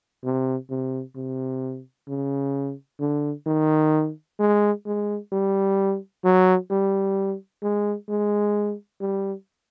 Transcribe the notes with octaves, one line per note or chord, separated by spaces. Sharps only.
C3
C3
C3
C#3
D3
D#3
G#3
G#3
G3
F#3
G3
G#3
G#3
G3